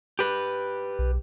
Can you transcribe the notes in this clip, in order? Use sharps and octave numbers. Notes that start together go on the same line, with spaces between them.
G4 B4
B1